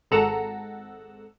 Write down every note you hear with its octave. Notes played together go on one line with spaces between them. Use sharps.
G#1 G#2 A4 F#5 A#5 E6